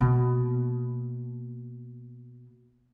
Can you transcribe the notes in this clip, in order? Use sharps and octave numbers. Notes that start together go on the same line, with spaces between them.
B2 A#3